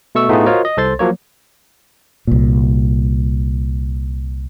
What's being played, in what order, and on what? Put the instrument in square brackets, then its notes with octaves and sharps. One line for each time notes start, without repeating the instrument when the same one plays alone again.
[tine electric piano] B2 A3 C#6 E6
A2 A3 B3 D#4 F4 G#4
F4 F#4 A#4 C5 C#5 D#5
D#5
C2 A4 C5 C6 A6
F3 F#3 A#3 C#5
[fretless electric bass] C2 A#2